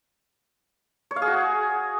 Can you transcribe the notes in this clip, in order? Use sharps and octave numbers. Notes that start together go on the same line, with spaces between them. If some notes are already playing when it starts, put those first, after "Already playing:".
C#5
F5
G#4
F#4